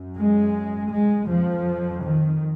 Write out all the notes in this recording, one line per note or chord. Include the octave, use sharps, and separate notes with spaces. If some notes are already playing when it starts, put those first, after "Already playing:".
Already playing: F#2
G#3
G#3
F2 F3
D#3